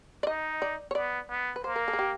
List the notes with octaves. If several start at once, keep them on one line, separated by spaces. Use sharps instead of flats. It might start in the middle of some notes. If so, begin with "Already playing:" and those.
D5
D#4 D#5
D5
C#5
B3 D5
B3
B4
A#3 C5
A#4
A4
G#4
G4